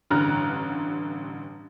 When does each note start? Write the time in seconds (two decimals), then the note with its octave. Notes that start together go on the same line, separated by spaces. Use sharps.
0.11 A1 G2 D3 A#5 F6 F#6